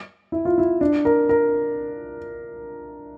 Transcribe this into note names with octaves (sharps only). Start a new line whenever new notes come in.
E4
F4
E4
D4
A#4
A#4